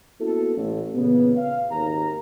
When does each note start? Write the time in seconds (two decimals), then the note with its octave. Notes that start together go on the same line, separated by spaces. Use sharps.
0.20 A#3 B3 C#4 E4 F#4 A4
0.56 A1
0.95 A#2 C#3 E3 B3
1.36 F5
1.71 G#1 D#2 A#5